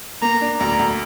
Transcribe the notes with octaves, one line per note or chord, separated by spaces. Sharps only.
A#3 A#5
D4
D2 A#5
D2